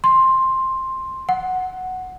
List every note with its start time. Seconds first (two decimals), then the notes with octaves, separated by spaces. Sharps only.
0.04 C6
1.29 F#5